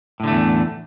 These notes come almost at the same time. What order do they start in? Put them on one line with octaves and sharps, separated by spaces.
A2 D3 A3 E2